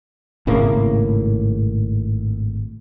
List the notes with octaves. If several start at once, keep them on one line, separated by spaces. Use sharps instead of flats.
G#1 A2 C#3 A#3